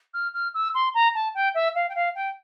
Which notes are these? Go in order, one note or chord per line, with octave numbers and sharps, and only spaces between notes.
F6
F6
E6
C6
A#5
A5
G5
E5
F5
G5
F5
G5